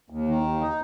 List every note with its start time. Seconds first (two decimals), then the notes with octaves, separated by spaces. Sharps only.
0.10 D#2
0.28 D#3
0.43 D#2
0.61 D#4